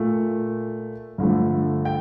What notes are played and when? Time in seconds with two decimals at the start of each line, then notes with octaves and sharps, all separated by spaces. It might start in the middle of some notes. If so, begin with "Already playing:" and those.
Already playing: A#2 A3
1.18 G2 D3 F3 A3
1.85 G5